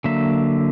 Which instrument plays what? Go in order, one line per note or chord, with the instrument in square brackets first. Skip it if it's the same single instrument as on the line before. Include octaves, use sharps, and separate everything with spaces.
[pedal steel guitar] D3 F#3 A#3 E5